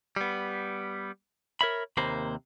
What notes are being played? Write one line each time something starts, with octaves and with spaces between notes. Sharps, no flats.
G3 B3
A#4 C#5 E5 B5
D#2 C3 A#3 C5 B5